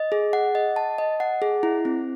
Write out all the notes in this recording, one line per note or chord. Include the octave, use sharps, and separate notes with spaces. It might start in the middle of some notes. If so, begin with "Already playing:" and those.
Already playing: D#5
G#4
F#5
D#5
A5
D#5
F#5
G#4
E4
C4